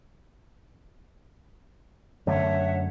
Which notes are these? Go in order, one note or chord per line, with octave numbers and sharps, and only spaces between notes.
F#2 D3 A3 C#5 E5 F#5